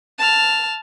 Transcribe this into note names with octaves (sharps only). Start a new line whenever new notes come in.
A5 F6